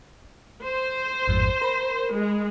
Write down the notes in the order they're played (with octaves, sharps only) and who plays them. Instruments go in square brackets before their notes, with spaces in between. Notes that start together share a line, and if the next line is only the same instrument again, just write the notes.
[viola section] C5
[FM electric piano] A1 F2 G#2
A#4 B5
[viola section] G#3